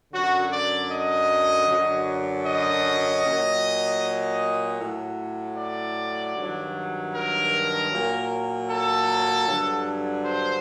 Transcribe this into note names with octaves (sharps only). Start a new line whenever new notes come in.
F#2 D3 F#3 F#4
D5
D#5
F#2 D3 F#3
D#5
A#2 F#3
A2 F#3
D5
G2 D#3 F#3
A#4
A#2 F#3
A4
G2 D3 F#3
C5